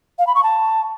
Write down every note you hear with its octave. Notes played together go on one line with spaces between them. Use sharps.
F5
B5
C#6
A5